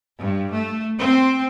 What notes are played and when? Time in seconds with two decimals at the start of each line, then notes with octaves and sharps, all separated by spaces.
0.18 G2
0.52 A3
0.98 C4